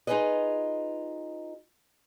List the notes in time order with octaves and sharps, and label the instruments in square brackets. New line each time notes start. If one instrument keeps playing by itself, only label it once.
[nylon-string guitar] D#4 F4 F#4 G#4 B4 D#5